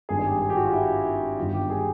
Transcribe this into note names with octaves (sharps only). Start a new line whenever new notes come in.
G#1 G2 D#3 G#4
G#4
G4
G#4
G4
F#4
F4
E4
G1 G2 D#3 F4
G4
G#4